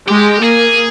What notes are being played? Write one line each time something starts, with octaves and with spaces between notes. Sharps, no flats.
G#3 G4
A#3 G#4